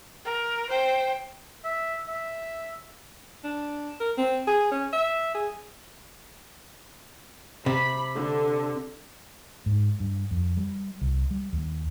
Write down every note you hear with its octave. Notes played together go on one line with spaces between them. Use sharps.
A#4
C5 G5
E5
E5
D4
A#4
C4
G#4
C#4
E5
G#4
C3 B5
D3
G#2
G2
F2
G3
C2
G3
D#2